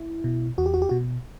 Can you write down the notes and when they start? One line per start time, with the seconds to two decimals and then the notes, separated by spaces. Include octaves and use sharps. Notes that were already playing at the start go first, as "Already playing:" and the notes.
Already playing: E4
0.24 B2
0.58 E2 F#4
0.66 G4
0.74 F#4
0.82 G4
0.89 B2 F#4